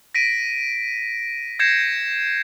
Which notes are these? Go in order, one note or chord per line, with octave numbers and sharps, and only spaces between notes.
A#6 B6 D7 D#7
G6 G#6 A#6 C7 C#7 E7